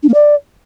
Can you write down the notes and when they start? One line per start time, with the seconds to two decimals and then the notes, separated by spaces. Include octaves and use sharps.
0.03 D4
0.09 A#3
0.14 D5